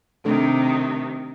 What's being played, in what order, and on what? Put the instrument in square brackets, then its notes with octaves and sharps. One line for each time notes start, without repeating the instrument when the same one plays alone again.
[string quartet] C3 D#3 [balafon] A3 D4 A4